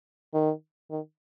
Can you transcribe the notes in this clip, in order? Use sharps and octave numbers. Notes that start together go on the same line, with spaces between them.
D#3
D#3